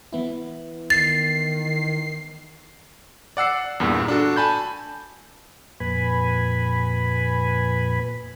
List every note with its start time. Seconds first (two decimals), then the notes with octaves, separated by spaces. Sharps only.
0.13 E3 B3 E4
0.90 D#3 A6 C7
3.37 D5 F#5 E6 C7
3.80 E2 G2 A#2
4.08 D4 F#4 A4
4.36 G#5 A5 B5 G6
5.80 F2 A#2 B4 G#5 B5